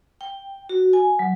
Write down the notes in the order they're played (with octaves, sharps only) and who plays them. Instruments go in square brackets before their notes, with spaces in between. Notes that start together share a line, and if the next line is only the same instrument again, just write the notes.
[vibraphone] G5
F#4
G#5
F#3